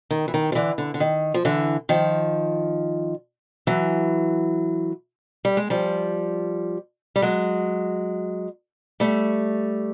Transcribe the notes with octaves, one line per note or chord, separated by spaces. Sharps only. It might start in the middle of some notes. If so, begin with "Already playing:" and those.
D#3
E3
D#3
F3
D3 E3
D3
D3
D#3
F3
D3 E3
D#3 F3
E3 F#3
G3
G#3
F3 G3
G3
F#3 G#3
G3 A3